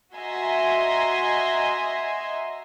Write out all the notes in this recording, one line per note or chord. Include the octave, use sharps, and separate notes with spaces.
F#4 D#5 E5 G#5 A#5 C6